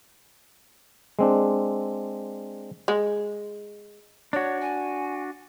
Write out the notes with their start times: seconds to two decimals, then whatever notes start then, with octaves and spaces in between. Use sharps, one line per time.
1.19 G#3 C4 D4
2.88 G#3
4.33 D4 F#4 C#5
4.61 G#5